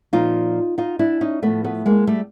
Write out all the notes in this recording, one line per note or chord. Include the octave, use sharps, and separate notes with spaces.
A#2 F3 D#4 F4
D#4 F4
D4 E4
C#4 D#4
A2 F3 A3 B3
A3 B3
G#3 A#3
G3 A3